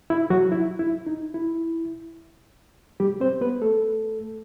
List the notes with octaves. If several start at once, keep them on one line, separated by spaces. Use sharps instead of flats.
E4
F#3 F#4
E4
E4
D#4
E4
G3 G4
C4 C5
B3 B4
A3 A4